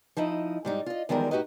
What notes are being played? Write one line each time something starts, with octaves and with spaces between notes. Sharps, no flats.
F3 D#4 E4 D#5
G#2 G3 D#4
F4 D#5
E2 D#3 F3 G3 G#3 A#4
A2 D#4 F#4 G4 B4 D#5